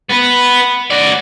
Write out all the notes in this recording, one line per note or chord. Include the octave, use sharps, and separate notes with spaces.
B3 B4
F#4 D5